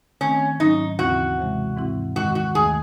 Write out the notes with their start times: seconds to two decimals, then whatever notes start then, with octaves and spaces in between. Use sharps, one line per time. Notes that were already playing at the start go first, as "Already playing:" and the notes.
0.21 D#3 A3 C4 C#4
0.60 G#2 F#3 C#4 D#4
0.99 D#2 C#3 E3 C4 E4 F#4
1.38 C3 E3 G#3
1.77 G#2 E3 C4 E4
2.16 F#2 D#3 G#3 F#4
2.35 F#4
2.55 D#2 D#3 A3 G#4